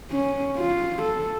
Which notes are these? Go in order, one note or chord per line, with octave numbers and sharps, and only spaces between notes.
C#4
F4
A4